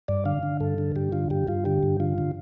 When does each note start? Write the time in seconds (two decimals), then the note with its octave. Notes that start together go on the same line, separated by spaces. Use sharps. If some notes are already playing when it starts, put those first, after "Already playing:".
0.08 G2 D5
0.25 D3 F5
0.43 D3
0.60 G2 A4
0.78 D3
0.96 G2 G4
1.12 D3 F4
1.30 G2 G4
1.48 G2 F4
1.65 D3 G4
1.83 G2
2.00 D3 F4
2.18 D3